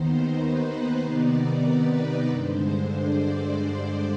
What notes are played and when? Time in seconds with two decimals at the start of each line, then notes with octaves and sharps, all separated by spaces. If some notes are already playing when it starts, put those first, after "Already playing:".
Already playing: D#2 D#3 B3 D#4 C5
0.38 B4
1.01 C3 D#3 B3 D#4 D5
1.64 B4
2.28 G2 D3 G#3 C5
2.92 D5